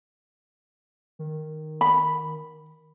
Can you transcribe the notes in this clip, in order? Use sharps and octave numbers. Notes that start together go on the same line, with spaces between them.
D#3
B5